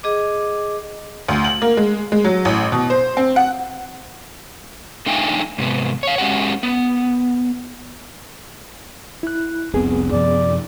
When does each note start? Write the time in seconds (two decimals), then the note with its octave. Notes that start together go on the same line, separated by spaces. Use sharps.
0.03 G#4 D#5 D6
1.29 D2
1.44 F#7
1.62 A#3
1.77 G#3
2.12 G#3
2.24 F#3
2.45 A1
2.72 B2
2.90 C5
3.17 C4
3.36 F#5
5.06 A3 D4 D#4 F5 G5 G#5
5.58 G#2 C3 B3
6.03 C#5 F5
6.18 G#3 C#4 F#4 G4 F#5
6.63 B3
9.23 E4 F#6
9.74 F1 C2 B3 C4 G#4
10.12 F#2 C3 F3 D5